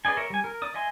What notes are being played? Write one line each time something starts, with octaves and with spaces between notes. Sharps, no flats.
G#4 B4 D5 D#5 G#5
A#4 C#5 E5
G3 G#5
A#4
D5 D#6
D#5 E5 G#5 C6